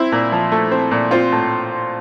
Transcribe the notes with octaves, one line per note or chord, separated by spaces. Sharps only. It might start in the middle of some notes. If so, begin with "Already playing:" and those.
Already playing: C4 E4
A#2
F3
A3
C4
A#2
C4 F4
A2